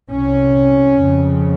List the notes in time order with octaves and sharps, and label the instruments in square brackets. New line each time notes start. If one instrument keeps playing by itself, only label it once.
[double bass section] C2 C3 C#4
F2 C#3